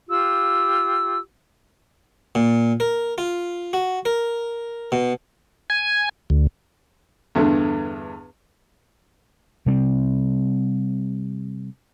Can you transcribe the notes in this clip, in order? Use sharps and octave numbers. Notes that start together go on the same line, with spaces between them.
F4 G4 E6
A#2
A#4
F4
F#4
A#4
B2
G#5
D2
E2 G2 D3 A3
C3 G3 A#3 C4